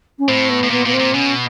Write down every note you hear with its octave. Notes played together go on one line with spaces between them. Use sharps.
C#4
A2 C4
B3
A2
A#2 B3
A#2 B3
C4
A#2
B2 C#4